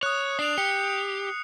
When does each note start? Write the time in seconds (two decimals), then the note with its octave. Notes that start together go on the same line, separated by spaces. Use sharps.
0.03 C#5 D#6 F#6
0.39 D4 C7 F7
0.58 G4 C#7